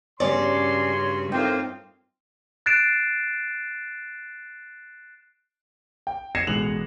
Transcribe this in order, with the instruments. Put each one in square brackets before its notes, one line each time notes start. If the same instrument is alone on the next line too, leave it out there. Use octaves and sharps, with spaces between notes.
[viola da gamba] G2 C#3 F#4 [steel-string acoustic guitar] C#4 D5 [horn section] C#5 C6
[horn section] A2 A#3 C5 [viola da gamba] C4 D#4 F4 [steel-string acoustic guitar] G5
[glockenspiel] F#6 A6 C7 D7 E7
[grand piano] G5
G#6 A#6 C7 C#7 D#7 E7
A1 B2 G#3 F#6 F7 F#7